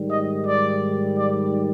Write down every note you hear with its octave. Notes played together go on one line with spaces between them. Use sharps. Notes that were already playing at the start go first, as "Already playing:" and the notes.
Already playing: G#2 D#3 G3
D#5
D5
D5